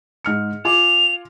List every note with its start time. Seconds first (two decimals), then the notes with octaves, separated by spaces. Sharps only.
0.25 G#2 F6 C#7
0.65 F4 G#5 D6 F7